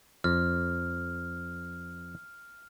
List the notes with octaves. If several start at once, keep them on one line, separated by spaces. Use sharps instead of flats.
F2 F6